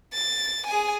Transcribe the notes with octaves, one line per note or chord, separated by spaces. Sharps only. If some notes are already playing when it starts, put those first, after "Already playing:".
A6
G#4 G#5